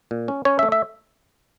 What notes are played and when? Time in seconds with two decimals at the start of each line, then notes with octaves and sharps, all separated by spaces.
0.11 A#2
0.28 C#4
0.45 C#4 C#5
0.59 A3 E5
0.72 E5